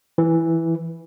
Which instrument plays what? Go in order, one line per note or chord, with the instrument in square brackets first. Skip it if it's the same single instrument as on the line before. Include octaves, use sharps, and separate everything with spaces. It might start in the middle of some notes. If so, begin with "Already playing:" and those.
[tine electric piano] E3